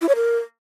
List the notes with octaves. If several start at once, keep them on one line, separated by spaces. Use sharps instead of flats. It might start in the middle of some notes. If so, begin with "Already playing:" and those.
E4
C#5
A#4